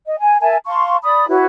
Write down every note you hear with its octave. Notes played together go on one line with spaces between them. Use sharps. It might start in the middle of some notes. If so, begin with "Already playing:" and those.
D#5
G#5
A#4 E5 G#5 A5
F5 A5 C6 C#6
D5 B5 D#6
E4 F#4 B4 C#5